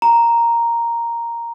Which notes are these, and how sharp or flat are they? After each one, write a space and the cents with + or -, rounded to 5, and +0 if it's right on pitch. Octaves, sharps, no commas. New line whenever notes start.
A#5 +0